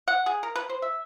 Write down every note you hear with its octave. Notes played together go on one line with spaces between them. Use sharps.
F#5
G#4
A#4
B4
C5
E5